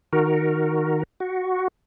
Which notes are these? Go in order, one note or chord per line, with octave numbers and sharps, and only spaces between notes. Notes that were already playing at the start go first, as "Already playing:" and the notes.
D#3 F#4 A#4
F#4